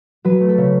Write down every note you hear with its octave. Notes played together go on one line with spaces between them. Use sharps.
F#3 B4
A3
A4
C#3